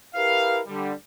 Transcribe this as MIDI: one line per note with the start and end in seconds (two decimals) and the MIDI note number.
0.15 0.60 64
0.15 0.60 67
0.15 0.60 70
0.15 0.60 71
0.15 0.60 77
0.67 0.93 50
0.67 0.93 55